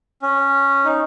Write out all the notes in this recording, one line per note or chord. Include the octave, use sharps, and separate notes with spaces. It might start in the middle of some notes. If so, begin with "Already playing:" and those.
C#4
D#4